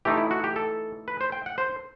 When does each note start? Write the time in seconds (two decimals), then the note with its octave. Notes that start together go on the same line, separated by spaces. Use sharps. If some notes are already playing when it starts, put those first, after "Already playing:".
0.05 E3 A3 D#4 G4
0.18 E4
0.31 F#4
0.44 G4
0.56 A4
1.08 B4
1.21 C5
1.32 G5
1.46 F#5
1.58 C5